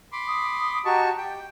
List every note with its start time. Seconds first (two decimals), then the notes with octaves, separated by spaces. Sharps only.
0.12 B5 C6 D6
0.27 D#6
0.85 F#4 G4 D#5 A5 A#5 C#6
1.18 G4 G5